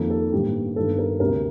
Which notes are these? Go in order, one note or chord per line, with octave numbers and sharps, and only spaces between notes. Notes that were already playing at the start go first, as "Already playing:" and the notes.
Already playing: F2 D#3 A#3 D#4 A4
A4
A1 G2 D#3 G3 A#3 G4
G1 G2 D#3 A4
A#4
D2 C3 G3 A#4